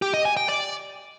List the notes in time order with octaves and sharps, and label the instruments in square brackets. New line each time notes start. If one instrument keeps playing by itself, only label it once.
[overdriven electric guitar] G4
D#5
G#5
G5
D5